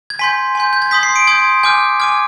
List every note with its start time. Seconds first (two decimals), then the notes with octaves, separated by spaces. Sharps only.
0.10 G#6
0.19 G#5 C6 G6 B6
0.55 G#5 C6 G6
0.73 G6
0.82 G#6
0.91 C6 D#6 G6 B6
1.03 C7
1.16 D7
1.27 C6 D#6 G6 G#6
1.63 G#5 D6 F6 G6
2.00 G#5 D6 F6 G#6